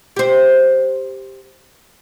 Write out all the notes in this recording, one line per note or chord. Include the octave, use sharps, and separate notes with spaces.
G4 C5